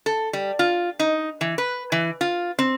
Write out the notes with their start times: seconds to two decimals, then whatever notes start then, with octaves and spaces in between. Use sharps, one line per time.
0.06 A4
0.33 G3
0.59 F4
0.99 D#4
1.41 E3
1.58 B4
1.92 E3
2.21 F4
2.59 C4